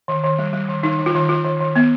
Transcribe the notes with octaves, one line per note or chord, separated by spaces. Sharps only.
D#3
D#3
G3
G3
D#3
D#3 D#4
D#3
F4
D#3
D#3 F4
D#3
D#3
B3